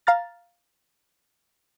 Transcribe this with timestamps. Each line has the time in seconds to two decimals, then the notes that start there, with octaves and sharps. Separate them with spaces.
0.07 F5 A#5 F6 A6